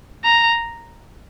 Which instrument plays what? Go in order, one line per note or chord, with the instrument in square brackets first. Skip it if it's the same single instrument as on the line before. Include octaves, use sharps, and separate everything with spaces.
[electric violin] A#5